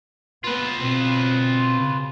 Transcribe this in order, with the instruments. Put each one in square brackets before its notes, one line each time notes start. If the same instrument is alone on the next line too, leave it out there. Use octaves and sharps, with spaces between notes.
[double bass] B3 [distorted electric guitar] F4 B4
[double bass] B2 C4
C#3